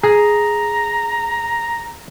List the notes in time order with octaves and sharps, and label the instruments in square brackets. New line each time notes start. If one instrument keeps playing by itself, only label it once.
[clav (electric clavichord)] G#4 [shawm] A#5